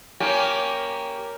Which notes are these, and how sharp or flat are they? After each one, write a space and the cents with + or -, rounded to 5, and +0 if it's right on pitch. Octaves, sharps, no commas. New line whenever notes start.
A#3 +0 C#4 +10 G4 +0